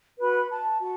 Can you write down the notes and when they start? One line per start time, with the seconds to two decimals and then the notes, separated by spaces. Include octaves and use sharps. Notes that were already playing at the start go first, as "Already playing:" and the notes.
0.19 F#4 B4 B5
0.50 A5
0.79 F#4 A5